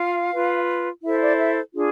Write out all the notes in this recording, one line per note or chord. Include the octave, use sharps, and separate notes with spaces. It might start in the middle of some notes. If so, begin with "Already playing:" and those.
Already playing: F4 F5
F4 B4
E4 A4 C5 E5
D5
E5
D4 F4 G#4